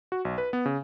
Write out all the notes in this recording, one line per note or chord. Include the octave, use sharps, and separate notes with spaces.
F#4
B1
B4
B3
C#3